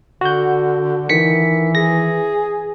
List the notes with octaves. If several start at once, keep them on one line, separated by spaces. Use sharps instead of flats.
D3 F#4 G6
D#3 E3 B6 C#7
G#4 A#6